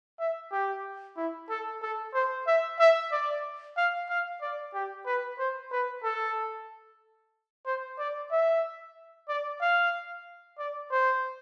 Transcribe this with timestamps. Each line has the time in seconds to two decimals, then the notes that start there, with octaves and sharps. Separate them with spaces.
0.19 E5
0.52 G4
1.17 E4
1.49 A4
1.82 A4
2.14 C5
2.47 E5
2.79 E5
3.12 D5
3.77 F5
4.09 F5
4.42 D5
4.74 G4
5.06 B4
5.39 C5
5.72 B4
6.04 A4
7.66 C5
7.99 D5
8.31 E5
9.29 D5
9.61 F5
10.58 D5
10.91 C5